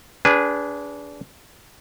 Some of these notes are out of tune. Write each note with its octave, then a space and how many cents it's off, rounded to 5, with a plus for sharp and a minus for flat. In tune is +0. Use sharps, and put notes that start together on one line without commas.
D4 -30 G#4 -15 B4 +0